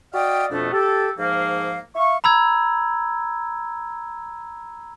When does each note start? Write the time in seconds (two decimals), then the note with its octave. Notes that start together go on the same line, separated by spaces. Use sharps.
0.14 F#4 D5 D#5 F5 G5
0.51 F2 B2 A3 B3 D4
0.72 G4 A4
1.19 G#2 F3 A#3 F5
1.95 E5 F5 C#6
2.24 A#5 B5 E6 G#6